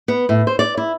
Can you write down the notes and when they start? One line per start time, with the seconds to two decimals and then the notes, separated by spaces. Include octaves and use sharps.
0.08 B3
0.29 A2
0.47 C5
0.59 D5
0.77 E4